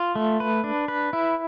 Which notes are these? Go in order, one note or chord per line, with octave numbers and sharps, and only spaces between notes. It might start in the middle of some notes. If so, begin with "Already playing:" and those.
Already playing: F4
A3
B4
D4
B4
E4